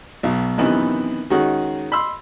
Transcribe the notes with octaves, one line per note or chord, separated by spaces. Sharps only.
B1 B2
F#2 C3 D#3 E3 B3 D#4
D#3 G#3 C#4 F#4 G#4
B5 C6 E6